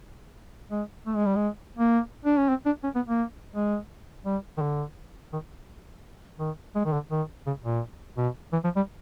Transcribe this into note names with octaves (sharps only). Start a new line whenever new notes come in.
G#3
A3
G#3
G3
G#3
A#3
D4
C#4
C4
D4
C#4
B3
A#3
G#3
G3
D#3
D3
D#3
D#3
G#3
D#3
D3
D#3
C#3
A#2
B2
E3
F3
G3